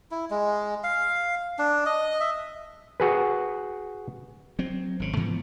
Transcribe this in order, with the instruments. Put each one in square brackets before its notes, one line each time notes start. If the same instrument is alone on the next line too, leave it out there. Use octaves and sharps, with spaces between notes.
[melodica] E4
G#3
F5
D4
D#5
E5
[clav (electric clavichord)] F#4 G#4 B4
[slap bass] F#3 C4
G#1 C#3
G#2 E3 F3 B3